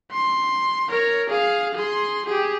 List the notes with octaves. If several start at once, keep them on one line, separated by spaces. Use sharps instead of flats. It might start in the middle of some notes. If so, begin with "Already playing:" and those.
C6
A#4 C#5
G#4 F5
G#4 C6
G4 G#4